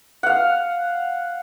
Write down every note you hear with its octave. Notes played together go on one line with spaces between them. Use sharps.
F5 F#5